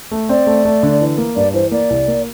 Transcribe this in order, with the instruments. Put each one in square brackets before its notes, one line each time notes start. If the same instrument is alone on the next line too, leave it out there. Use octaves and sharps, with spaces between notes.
[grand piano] A3
[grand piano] C4 [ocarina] D5
[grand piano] A3
A3
D3
E3
A#3
[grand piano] G2 [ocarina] D5
[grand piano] E3 [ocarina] C5
[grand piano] A#3 [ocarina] D5
[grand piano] C2
A#3